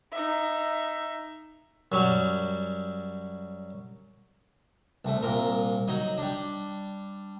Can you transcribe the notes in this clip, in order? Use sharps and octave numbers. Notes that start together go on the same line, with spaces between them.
D#4 E5
F#2 F#3 G3
C2 A3
C2 A#2 A#4
F#3 D#4
G3 D4